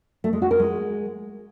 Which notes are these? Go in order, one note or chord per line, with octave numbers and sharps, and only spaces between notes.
A3
G#3
F#4
A#4
G#3